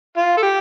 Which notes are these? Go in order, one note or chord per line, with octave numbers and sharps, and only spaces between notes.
F4
A4
G4